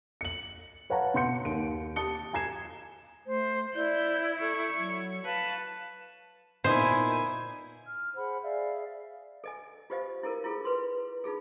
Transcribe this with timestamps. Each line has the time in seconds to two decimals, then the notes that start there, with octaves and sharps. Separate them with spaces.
0.21 C#7 F#7
0.90 B4 C#5 F5 F#5 A5 A#5
1.14 B2 F#5 C6 G6 C#7
1.45 D#2 D7
1.96 G4 A5 D#6 C#7 G7
2.33 G#5 A#5 G#6 C7 E7
3.27 A3 C5
3.75 E4 D5 G6
4.40 A4 C#6
4.79 F#3
5.25 B4 F5 A5
6.64 A#2 B3 D#4 E4 C5 G#5
7.87 F6
8.15 G#4 C5 F#5 B5
8.43 G#4 D5 E5 F5
9.44 A4 D#5 G#5
9.90 F4 G4 C5 D#5 F5
10.23 E4 A4 A#4
10.44 E4 F4 G#4 A4
10.65 B4 C6
11.24 D#4 F4 G#4 A4